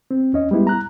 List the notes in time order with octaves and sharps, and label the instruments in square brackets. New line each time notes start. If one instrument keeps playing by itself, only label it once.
[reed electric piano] C4
D#2 C#4 D#5
G3 G#3 B3 E4
A#5 F#6